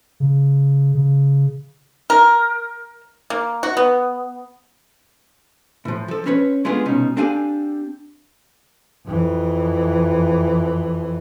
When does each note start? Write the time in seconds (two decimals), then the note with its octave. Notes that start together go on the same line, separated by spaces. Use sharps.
0.20 C#3
0.95 C#3
2.10 A#4
3.30 A#3
3.63 F#4
3.77 B3
5.85 A2 F3
6.08 F3 A4
6.26 C4 C#4 B4 C#5
6.65 G#3 A3 B3 D4 F4 G#4
6.85 C2 B2 C#4 D#4
7.17 C4 D4 G4 A4 F5 G#5
9.07 F2 E3